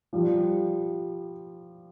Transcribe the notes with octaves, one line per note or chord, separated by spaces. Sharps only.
F3 G3